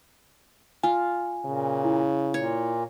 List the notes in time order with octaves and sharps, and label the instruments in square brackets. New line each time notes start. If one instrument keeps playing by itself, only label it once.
[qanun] F4 [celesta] G#5
[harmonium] A#2 [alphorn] C#3
[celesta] E4
[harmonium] A#2 [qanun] C#5